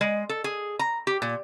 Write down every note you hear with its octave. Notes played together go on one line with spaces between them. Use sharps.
G#3
A4
G#4
A#5
G4
A#2